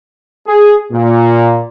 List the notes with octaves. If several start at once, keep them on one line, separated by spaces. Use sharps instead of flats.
G#4
A#2